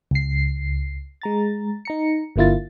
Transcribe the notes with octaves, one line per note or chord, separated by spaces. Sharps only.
C#2 C7
G#3 A#5 A6
D#4 A#5 C#7
G1 D3 A#3 E4 F4 A6